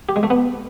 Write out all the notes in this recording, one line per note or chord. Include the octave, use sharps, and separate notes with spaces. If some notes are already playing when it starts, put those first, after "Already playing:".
G4
G#3
A3
B3